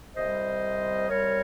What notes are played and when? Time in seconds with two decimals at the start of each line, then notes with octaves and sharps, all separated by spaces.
0.16 C2 C3 G3 C5 D#5
1.09 C2 C3 G3 A#4 C#5